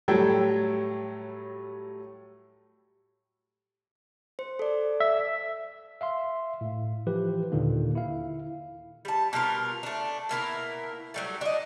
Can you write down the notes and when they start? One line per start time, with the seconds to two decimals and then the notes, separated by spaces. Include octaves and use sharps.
0.08 A2 F#3 G3 A4 G5 G#6
4.39 C5
4.59 A4 D5
5.00 E5
6.01 E5 F5 C6
6.61 A2
7.07 E3 F3 G4 B4
7.52 D#2 A#2 D3 D#3 A#3
7.95 E4 F5
9.05 G3 A5
9.33 B2 G3 F4 A#4
9.83 A3 D4
10.29 B2 A#3 E4 A#4
11.14 F#3 G3 A3
11.41 D4 D#5